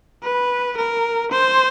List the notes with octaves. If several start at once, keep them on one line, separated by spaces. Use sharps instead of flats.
B4
A#4
C5